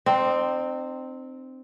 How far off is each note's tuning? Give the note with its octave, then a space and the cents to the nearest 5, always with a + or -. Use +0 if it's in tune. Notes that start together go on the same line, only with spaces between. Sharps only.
C4 -5 D#4 -45